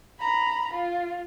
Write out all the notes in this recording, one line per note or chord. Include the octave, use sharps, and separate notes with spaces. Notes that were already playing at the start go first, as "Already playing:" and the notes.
A#5 B5
F4